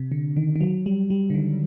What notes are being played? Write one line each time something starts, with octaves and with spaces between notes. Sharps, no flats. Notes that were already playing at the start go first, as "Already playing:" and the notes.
Already playing: C3
D3
D#3
D#3
F#3
G3
G3
D3
D#3